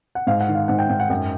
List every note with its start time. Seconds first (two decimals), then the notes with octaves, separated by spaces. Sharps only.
0.15 F#5
0.27 G#2 F5
0.41 F#5
0.48 D#3
0.55 F5
0.68 G#2 F#5
0.79 G5
0.89 G#2 G5
1.00 F#5
1.10 F#2 G5